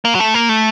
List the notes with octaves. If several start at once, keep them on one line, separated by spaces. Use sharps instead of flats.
A#3
F#3
A3
A#3
A3